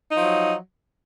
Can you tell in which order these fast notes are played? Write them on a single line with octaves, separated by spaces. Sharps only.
D#4 F3 F#3